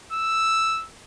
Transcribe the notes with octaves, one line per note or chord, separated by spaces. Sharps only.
E6